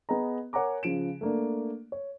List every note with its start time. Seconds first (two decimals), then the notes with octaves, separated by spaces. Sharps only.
0.09 B3 G#4 D#5 A#5
0.53 A#4 C#5 F#5 G#5 A#5 D6
0.83 C#3 F3 D7 E7
1.21 A3 A#3 D4
1.92 C#5